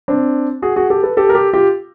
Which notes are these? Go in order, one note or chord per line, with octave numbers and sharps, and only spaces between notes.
C4 D4
F#4 G#4
F#4 G#4
G4 A4
A4 B4
G4 A4
A#4
G4 A4
F4 G4